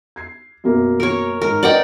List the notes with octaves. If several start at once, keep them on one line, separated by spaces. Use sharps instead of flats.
G#6 C7
F#2 B2 A#3
A#4 C#5
G#2 A#4
B4 D5 D#5 F#5 G5